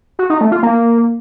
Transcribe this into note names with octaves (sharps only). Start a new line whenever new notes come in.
F#4
D#4
A3
F4
A#3